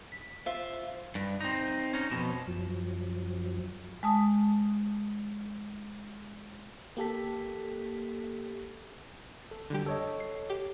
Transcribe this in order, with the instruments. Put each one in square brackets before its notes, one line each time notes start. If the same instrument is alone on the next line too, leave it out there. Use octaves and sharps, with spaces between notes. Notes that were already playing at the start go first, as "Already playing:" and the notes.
[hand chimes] B6
[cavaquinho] F4 E5 [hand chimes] C5
[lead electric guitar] G2
C4 D#4
C#4 D#4
F2 B2
[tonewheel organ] F#2 F3 F#3
[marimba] G#3 A5 D#6
[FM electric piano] A#3 G4 A4 B6
[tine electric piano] A4
[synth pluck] D3 G3 G4
[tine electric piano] A4 C#5 D#5
[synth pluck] C7
G4